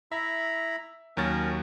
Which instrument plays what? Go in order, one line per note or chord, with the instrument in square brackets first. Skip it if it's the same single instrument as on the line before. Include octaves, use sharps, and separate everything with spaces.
[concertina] E4 A#5 B5 [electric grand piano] E5
[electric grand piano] D#2 F#3 A6 [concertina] C#4 A#4